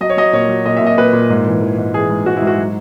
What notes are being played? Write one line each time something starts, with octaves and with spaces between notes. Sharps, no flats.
F#3 D#5
C#5
F#3 D#5
A#2 C#5
F#3
A#2 D#5
E5
A#2
D#5
A#2 B4
A#2
G#2
E3
E3
G#2
E3 G#4
G#2
G#2 F#4
E4
G#2
F#4
F#3